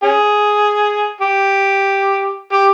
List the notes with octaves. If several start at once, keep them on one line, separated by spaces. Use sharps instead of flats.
C#4 G#4
G4
G4